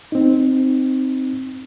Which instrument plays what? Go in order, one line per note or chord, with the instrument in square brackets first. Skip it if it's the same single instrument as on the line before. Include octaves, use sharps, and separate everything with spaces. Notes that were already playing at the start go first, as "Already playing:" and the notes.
[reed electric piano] C4 D#4